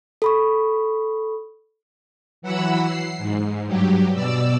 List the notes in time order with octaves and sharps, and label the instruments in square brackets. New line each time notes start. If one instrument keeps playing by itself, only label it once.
[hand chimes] A4 B5 C#6
[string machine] E3 F#3 F#5 B5 E6
C7
G#2
G2 F#3 G4
B2 D5 E6